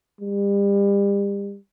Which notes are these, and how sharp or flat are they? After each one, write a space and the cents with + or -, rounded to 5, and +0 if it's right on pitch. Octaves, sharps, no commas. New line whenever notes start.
G3 +35